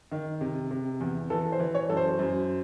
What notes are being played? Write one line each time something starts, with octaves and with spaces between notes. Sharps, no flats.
D#3
C3
C3
E2
E3 A4
C5
E3
C#5
F#2 A4
C5
F#2